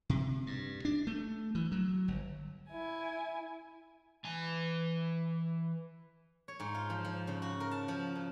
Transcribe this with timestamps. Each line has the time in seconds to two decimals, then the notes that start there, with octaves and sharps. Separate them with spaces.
0.09 C3
0.47 G2
0.85 D4
1.07 A3
1.55 E3
1.72 F#3
2.08 G1
2.70 E4 G#5
4.24 E3 G#5
6.48 C#5
6.60 G#2
6.75 F4
6.90 F3
7.05 F3
7.27 C#3
7.42 F#4
7.60 A#4
7.71 A5
7.88 F3
8.15 C#3